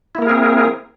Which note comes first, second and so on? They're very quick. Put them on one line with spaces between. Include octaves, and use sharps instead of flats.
E4 A#3 A#4 G#4 C4